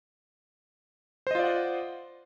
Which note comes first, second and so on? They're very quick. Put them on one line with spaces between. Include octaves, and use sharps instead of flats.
C5 D#5 F4 D5 F#5